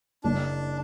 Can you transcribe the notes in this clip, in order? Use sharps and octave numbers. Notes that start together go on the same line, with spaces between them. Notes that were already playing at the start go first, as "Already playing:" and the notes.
F#1 D4